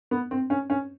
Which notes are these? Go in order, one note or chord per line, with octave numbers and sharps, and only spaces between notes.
B3
C4
C#4
C#4